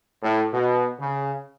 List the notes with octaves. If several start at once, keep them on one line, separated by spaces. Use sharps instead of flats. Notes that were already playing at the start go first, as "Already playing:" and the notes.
A2
B2
C#3